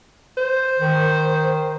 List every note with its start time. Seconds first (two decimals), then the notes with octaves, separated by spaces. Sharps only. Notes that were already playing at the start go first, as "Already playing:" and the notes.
0.38 C5
0.79 D#3